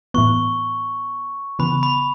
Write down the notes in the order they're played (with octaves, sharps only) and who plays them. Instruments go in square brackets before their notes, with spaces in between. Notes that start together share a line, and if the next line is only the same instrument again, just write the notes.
[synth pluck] A2 E3 B3 [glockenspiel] C#6
[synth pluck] C#3 E3 B3 [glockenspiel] B5
[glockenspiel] B5